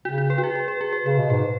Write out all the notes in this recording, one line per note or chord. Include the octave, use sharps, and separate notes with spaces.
C#3 F#4
F#4
B4
F#4
G#4
B4
B4
G#4
B4
C#3 B4
B2
G#2 B4